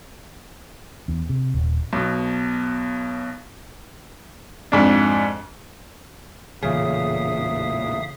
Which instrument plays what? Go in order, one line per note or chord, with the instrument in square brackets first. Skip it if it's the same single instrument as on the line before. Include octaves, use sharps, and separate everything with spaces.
[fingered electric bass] E2
C3
D#1
[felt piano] B1 B2
[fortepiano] F2 G#2 D4
[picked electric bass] A1 E2 A#2 [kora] C#3 [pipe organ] E5 F5 D#6